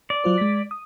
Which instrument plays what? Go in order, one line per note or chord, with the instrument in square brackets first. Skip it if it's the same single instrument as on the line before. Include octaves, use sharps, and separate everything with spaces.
[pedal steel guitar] D5
[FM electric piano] F#3 F4 C5
G#3 B6
D#6